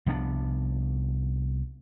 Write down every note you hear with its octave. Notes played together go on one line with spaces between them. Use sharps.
C2 F3 B3 D4